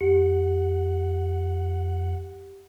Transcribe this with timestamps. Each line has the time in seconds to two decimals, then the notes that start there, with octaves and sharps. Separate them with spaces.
0.01 F2 G4 F#5